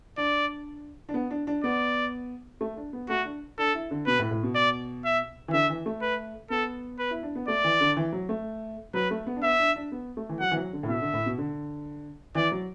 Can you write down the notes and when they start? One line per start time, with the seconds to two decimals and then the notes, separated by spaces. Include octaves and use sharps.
0.17 D4 D5
1.09 D4
1.14 B3
1.31 D4
1.47 D4
1.64 B3 D5
2.61 A3
2.77 D4
2.93 B3
3.09 A3 F#4
3.25 D4
3.58 D4 A4
3.74 E4
3.91 D3
4.06 B2 B4
4.19 A2
4.31 A2
4.43 B2
4.55 D5
5.05 E5
5.48 E3
5.53 D3 E5
5.70 E3
5.86 A3
6.02 B4
6.50 B3 A4
6.99 B4
7.11 E4
7.23 D4
7.35 B3
7.48 A3 D5
7.64 E3
7.81 D3
7.97 E3
8.13 F#3
8.29 A3
8.94 F#3 B4
9.11 A3
9.27 B3
9.36 D4
9.43 B3 E5
9.59 D4
9.76 D4
9.92 B3
10.17 A3
10.29 E3
10.40 F#3 F#5
10.51 E3
10.56 F#3
10.73 D3
10.83 A2
10.89 B2 E5
11.02 D3
11.13 A2
11.26 B2
11.38 D3
12.35 E3 D5
12.52 F#3